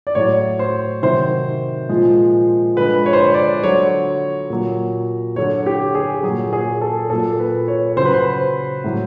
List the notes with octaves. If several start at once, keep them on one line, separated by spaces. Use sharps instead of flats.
D5
A2 F#3 C#5
C5
C3 D#3 F#3 C5
A#2 F3 G#3
D3 F3 G#3 B4
C#5
C5
C#5
D5
D3 F#3 C#5
A#2 F#3
D3 F#3 C#5
G4
G#4
A#2 F#3 G#4
G#4
A4
A#2 F#3 A4
B4
C#5
C#3 F#3 B4 C5
C5
A2 F#3